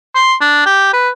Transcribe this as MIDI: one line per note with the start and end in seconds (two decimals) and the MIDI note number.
0.15 0.35 84
0.41 0.61 62
0.66 0.89 67
0.93 1.09 71